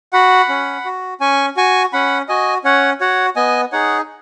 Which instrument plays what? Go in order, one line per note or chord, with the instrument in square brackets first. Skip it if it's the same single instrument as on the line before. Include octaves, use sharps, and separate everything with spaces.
[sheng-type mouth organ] F#4 F#5 B5
C#4
F#4
C#4 G#5 C#6
F#4 G#5 C#6
C#4 F#5 B5
F#4 D#5 G#5
C#4 C#5 F#5
F#4 C#5 F#5
B3 D#5 G#5
D#4 G#4 C#5 F#5